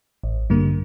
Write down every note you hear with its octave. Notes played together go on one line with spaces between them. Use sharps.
A1
G2 D3 G3 A#3